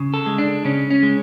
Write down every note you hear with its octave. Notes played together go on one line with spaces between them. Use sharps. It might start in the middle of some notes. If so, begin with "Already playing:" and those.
Already playing: C#3
A4
G#3
D4
C#3 C#4
C#4
G#3